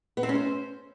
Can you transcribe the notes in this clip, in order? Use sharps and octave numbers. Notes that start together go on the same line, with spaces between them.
B3
C4
C#4
C5